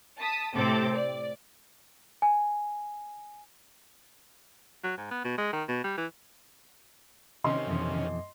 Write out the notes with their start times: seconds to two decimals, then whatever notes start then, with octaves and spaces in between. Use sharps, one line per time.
0.18 A5 D#6 B6
0.55 A2 C3 C4 A4 D6 A6
0.95 D5
2.22 G#5
4.84 F#3
4.97 G#2
5.11 B3
5.24 B2
5.38 G#3
5.53 D#3
5.69 B2
5.84 G3
5.97 E3
7.44 C3 D#3 C#4 D#5 C6
7.67 F2 B2 E3